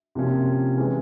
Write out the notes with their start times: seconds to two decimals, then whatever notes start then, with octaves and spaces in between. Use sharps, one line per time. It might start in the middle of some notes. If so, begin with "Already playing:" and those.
0.15 C3 F3 A#3 C#4 F4
0.78 E3 G#3 C#4